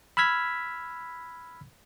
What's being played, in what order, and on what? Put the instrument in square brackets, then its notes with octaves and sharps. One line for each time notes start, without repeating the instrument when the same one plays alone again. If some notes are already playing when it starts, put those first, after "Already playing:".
[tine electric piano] B5 E6 F6 G#6 B6